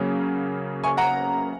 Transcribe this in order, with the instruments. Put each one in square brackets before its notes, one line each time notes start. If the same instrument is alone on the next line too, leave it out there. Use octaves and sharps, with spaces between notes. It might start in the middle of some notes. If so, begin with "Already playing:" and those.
Already playing: [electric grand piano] C#3 F#3 A#3 C#4 G#4
[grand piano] G#5 C#6
F#5 A#5